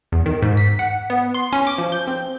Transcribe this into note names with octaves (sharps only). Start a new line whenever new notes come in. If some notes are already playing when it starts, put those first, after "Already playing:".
E2
D#3
G#2
B6
F#5
B3
C6
C#4
D6
F3
G6
C4